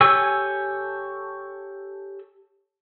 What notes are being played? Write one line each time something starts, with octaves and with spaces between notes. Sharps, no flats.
G4 A4 C#5 G#5 E6